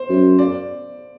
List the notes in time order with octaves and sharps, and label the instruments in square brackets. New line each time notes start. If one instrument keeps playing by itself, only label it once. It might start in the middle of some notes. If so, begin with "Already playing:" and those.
Already playing: [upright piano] C5
[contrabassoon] F#2
[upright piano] D5